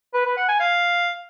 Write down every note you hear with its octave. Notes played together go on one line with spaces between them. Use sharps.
B4
B4
F#5
G#5
F5